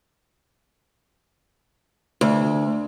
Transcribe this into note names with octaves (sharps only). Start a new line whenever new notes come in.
D2